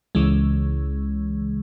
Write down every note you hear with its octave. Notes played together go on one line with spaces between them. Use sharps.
C#2 C#3 E3 G#3